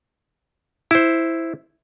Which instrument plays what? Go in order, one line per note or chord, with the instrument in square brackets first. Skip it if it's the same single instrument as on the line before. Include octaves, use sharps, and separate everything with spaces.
[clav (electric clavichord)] E4 C5